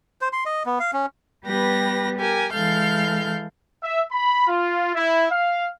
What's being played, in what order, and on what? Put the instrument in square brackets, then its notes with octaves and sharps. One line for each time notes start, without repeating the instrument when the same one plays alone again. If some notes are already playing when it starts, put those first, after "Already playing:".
[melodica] C5
C6
D#5
B3
F5
C#4
[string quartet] G3 B3 G4 B4 A#6
G4 A#4 G#5
E3 G#3 A4 F5 F6 G6
[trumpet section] E5
B5
F4
E4
F5